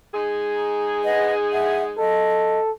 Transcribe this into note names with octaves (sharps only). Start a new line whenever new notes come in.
G#3 D#4 G#4
A#5
B4 D#5 F#5
E5 F#5
A4 D#5